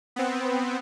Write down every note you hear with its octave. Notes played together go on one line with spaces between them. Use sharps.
B3 C4